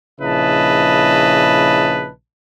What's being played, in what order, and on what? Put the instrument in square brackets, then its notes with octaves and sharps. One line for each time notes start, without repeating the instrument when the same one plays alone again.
[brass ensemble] A#1 C#3 E4 B4 D#5 A5